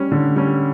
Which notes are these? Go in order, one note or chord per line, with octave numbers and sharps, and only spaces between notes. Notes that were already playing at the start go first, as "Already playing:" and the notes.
Already playing: G3 C#4
D3
G3 C#4